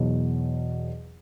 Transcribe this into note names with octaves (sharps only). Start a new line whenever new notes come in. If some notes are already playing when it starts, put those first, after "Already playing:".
Already playing: E2 B2 F#3